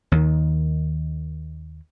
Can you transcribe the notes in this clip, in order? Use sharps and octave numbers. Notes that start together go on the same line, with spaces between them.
D#2 D#3